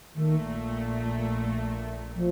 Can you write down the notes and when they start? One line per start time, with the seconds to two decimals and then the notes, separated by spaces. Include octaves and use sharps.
0.15 A#1 A#2 D#3 A3
2.16 F3